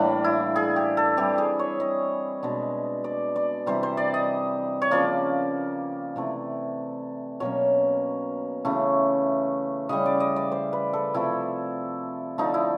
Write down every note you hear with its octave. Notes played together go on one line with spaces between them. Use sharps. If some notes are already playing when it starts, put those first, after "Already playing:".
Already playing: A2 E3 G3 A#3 D4
E4
G#4
G4
A4
E3 G3 C4 G4
G#4
C#5
D#5
B2 G#3 B3 D4
D5
D5
C3 E3 G3 C5
C5
D5
D#5
C#5
C#3 F3 A#3 D5
C3 E3 A3
B2 F#3 A#3 C#4 C#5
C#3 E3 A3
C#3 E3 G3 D#5
D5
D#5
D5
C5
B4
A4
C3 F3 A3 E4
D3 F3 A3 D4 D#4
E4